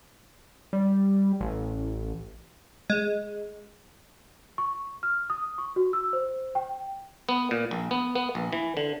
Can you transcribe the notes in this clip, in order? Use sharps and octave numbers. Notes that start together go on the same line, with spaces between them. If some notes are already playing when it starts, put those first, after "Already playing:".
G3
A1
G#3
C#6
F6
D#6
C#6
F#4
E6
C5
G5
B3
A#2
A#1
B3
B3
A#1
E3
D3